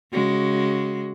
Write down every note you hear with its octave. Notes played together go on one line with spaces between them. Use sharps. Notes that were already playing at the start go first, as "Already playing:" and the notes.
C#3 G#3 F#4